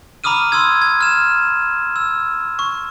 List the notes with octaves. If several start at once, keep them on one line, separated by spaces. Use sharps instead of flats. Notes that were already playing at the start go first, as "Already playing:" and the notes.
A#5 B5 D6 D#6 F6 D#7
C6 D#6 E6 G#6
G#6
F6 E7
E6
C#6